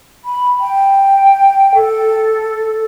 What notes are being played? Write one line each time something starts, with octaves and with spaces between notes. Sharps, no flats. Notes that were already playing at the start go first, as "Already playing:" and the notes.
B5
G5
A4